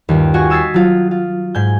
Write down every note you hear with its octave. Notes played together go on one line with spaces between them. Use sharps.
G1 D#2
F4 F#4 F#5 G#5 C#6
D#6 E6 G#6 A6 B6 C7
F#3 F4
F4
G#2 G#5 G6